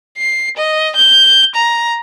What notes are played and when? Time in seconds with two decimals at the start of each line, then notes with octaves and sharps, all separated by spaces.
0.18 C7
0.57 D#5
0.96 G6
1.55 A#5